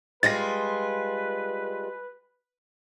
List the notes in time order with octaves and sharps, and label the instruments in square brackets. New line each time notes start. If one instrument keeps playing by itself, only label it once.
[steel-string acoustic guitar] G3 G#3 F4 [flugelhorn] B4 [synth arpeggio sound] A6 A#6